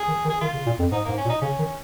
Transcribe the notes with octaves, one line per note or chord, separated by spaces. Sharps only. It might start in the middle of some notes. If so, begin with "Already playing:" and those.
Already playing: G#4
D#3
D#3
G#4
D#3 F4
C#3
A#2
F2
G#2 D#4
G#2 A#3
C#4
A#2
D#4
C#3 C#4
D#3